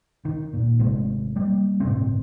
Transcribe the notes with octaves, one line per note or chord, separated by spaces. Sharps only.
D#3
A#2
G#1 G#2 C3 A3
G3 A#3
G1 A2 C3 C4